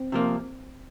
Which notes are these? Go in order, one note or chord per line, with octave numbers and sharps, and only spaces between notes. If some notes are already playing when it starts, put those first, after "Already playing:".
Already playing: C4
C3 F3 A#3